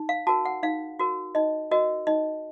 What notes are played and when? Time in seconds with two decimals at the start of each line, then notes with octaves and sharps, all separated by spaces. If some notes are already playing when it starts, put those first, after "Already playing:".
Already playing: D#4
0.09 F5
0.27 F#4 A#4 A5
0.45 F#5
0.63 D#4 F5
0.99 F#4 A#4
1.35 D#4 D#5
1.71 F#4 A#4 D#5
2.07 D#4 D#5